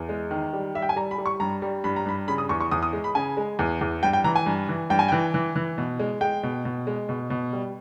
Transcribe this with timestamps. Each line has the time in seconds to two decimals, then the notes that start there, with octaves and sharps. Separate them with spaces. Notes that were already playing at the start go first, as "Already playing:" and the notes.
Already playing: E2
0.09 G#3
0.31 D#3
0.53 G3
0.75 G3 E5
0.82 G5
0.89 G#5
0.96 G3 A#5
1.11 B5
1.18 G3
1.26 C#6
1.40 G2 A#5
1.62 G3
1.84 G2 B5
1.96 A#5
2.06 G2 B5
2.28 C#3 B5
2.38 D#6
2.49 E2 C#6
2.60 C#6
2.71 E2 D#6
2.83 D#6
2.93 G#3
3.04 B5
3.15 C#3 G#5
3.37 G#3
3.59 E2
3.81 E2
4.03 G2 G5
4.13 G5
4.24 E3 A#5
4.36 G#5
4.46 G2
4.69 E3
4.90 G2 G5
4.99 G#5
5.08 E3 G5
5.34 E3
5.56 E3
5.78 B2
5.99 G#3
6.21 G#3 G5
6.43 B2
6.65 B2
6.87 G#3
7.09 B2
7.30 B2
7.53 G3